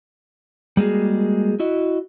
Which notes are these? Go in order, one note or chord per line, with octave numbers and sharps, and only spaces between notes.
G3 G#3 A#3 F#4 G#4
E4 F#4 D#5